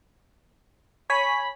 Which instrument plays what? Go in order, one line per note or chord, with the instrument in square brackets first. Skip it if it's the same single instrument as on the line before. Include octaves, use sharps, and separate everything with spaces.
[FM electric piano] C#5 G#5 B6 [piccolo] B5